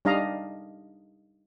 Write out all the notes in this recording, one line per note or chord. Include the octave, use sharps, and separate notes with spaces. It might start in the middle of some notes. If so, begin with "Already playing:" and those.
G3 D4 D#4 D#5 F5 A#5